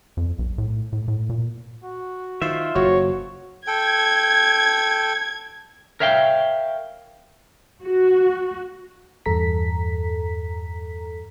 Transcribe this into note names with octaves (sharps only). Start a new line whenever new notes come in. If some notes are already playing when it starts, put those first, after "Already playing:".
F2
B1
A2
A2
A2
A#2
F#4
D#3 F4 C5 E5
F#1 F#4 C#5
A4 G5 G#6
A#4 C#5 E5 F5 G5
F#4
E2 G2 A4 A#5 B6